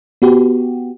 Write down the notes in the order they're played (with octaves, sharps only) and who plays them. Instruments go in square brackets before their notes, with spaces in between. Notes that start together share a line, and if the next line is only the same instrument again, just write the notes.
[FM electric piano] B3 F#4 G4